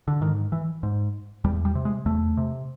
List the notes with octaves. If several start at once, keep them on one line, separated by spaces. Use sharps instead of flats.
D3
G#2 D#3
E3
G#2
E2 G3
G3
C3
G#3
E2 A3
C3